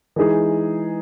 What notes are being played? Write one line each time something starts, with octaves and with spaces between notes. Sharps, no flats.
E3 G#3 D#4 G#4